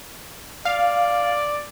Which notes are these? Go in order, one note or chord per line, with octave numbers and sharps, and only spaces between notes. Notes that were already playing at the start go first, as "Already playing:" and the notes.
D5 F5